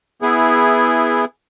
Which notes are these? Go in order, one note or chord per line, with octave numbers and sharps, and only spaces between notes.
B3 E4 G#4